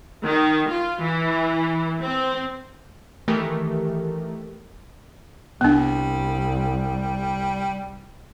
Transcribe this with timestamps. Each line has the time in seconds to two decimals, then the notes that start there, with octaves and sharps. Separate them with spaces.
0.23 D#3
0.70 F4
1.02 E3
2.01 C4
3.28 D#3 E3 A3 G4 A#4
5.61 C2 G3 B3 D4